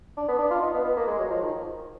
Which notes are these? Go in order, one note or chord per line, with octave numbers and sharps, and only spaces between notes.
D4
B3
D4
F4
D#4
B3
B3
A#3
G#3
F#3
F3
D#3